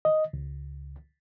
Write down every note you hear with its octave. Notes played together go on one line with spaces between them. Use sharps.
D#5
C#2